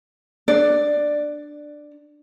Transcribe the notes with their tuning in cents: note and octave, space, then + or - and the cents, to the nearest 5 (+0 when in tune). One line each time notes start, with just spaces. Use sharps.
D4 +10 D5 +5